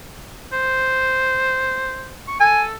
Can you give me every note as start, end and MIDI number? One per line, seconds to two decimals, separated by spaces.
0.53 2.15 72
2.27 2.37 85
2.40 2.75 69
2.40 2.63 80